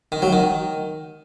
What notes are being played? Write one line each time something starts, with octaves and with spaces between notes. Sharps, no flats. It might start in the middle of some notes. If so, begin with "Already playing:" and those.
D#3
F#3
D#3